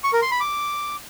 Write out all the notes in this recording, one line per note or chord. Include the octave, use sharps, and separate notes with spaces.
C#6
A#4
C6
B5
D6